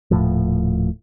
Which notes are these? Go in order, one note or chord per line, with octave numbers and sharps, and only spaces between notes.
D#1 A2 F3